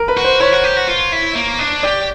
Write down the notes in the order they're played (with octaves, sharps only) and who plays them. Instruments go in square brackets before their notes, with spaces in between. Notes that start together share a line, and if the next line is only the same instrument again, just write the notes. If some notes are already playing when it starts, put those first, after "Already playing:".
Already playing: [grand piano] A#4
B4
[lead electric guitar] F#4
[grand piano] C5
[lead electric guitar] E4 [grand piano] C#5
[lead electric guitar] F#4
G4
F#4
F4
E4
A#3
D4
[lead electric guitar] G4 [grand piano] D5